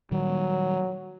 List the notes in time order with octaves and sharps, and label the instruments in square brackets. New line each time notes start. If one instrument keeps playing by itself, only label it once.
[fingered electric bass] A#2 D#3 G3 [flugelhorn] F#3